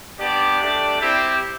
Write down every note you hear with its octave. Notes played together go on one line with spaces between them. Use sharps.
B3 D4 G4 D5
A3 D4 G4
C4 E4 G4